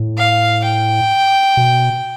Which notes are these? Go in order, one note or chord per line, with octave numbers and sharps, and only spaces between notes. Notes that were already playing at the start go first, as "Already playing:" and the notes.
Already playing: A2
F5
G5
B2